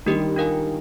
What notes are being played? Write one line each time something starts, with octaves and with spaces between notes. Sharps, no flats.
D#3 G3 D4 G4 A#4
D4 F4 A#4 F5 G#5